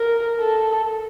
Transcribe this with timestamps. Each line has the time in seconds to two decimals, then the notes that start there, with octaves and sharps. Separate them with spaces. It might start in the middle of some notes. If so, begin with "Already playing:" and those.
Already playing: A#4
0.40 A4